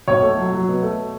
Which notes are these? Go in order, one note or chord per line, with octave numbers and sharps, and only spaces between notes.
B1 C#5
A3
F#3
F#3
B2
A3